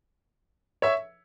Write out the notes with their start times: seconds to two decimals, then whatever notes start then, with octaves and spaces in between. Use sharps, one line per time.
0.82 C#5 E5